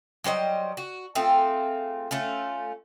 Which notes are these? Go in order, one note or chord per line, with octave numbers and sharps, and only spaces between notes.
F#3 G3 C5 D#5
F#4
A3 C4 F4 G#4
A3 C#4 F4